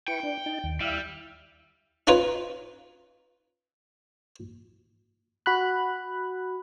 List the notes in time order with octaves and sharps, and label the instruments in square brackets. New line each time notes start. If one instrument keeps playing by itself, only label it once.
[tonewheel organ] E4 B4 C#6 [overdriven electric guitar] G5
[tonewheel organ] D4
D#4 A5
D#2
[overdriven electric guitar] G3 [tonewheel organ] E4 E5 F5
[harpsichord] C#4 D#4 F4 B4 C#5
[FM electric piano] F#4 B5 F#6